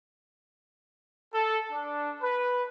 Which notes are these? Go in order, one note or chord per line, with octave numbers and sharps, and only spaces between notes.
A4
D4
B4